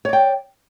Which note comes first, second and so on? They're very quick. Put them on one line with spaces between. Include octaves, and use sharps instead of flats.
C#5 D5 G5